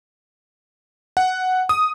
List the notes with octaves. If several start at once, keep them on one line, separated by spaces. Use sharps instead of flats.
F#5
D#6